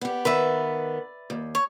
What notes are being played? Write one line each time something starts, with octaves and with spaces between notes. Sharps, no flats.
B3 G4
D#3 B3 B4 D5 E5
D#2
C#5